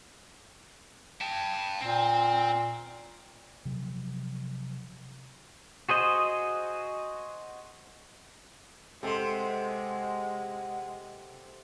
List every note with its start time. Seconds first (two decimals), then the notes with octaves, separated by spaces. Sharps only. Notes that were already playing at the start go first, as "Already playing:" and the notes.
1.21 G5 A5
1.81 A#2 C4
3.65 C3 F3 F#3
5.89 F#4 G#4 C5 D#5
9.03 C3 G#3 A4 F#5 C6